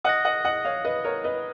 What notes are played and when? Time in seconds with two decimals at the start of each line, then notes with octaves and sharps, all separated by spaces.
0.04 D#5 F#5 D#6 F#6 A#6
0.25 D#5 F#5
0.45 D#5 F#5
0.65 C#5 F5
0.85 B4 D#5
1.05 A#4 C#5
1.24 B4 D#5